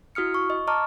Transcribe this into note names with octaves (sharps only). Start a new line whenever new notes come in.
E4 F#4 D#6 F6 C#7
C#6
D#5
D#5 A5 A#5 C#6 D6 F6